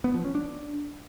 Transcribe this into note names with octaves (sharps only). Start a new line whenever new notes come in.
B3
F3
C#4
D4